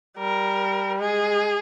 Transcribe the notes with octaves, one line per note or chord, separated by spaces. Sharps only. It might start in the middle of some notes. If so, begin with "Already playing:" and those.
G3 A#4
G#3 G#4